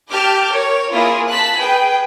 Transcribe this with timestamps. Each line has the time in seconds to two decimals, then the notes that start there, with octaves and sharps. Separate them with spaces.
0.10 G4 A5 D6 F6 G6 D7
0.49 A#4 C#5
0.92 A#3 E4 F4 G#4
1.28 A5 F#6 B6
1.57 G#4 B4 G5